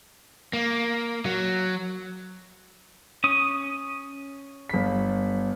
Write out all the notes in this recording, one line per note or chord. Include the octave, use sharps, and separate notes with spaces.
A#3
F#3
C#4 D#6
G1 B6